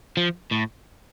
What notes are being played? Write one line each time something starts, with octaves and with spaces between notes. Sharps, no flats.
F3
A2